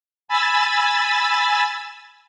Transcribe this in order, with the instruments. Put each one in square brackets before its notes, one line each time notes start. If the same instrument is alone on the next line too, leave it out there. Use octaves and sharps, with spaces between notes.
[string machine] G#5 B5 E6 A6